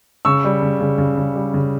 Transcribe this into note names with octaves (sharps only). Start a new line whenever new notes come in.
C#3 C#6 E6
G3
C#3
C#3
C#3
C#3
G3
C#3